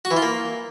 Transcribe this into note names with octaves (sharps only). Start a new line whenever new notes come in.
F#4
E3
F4
A#3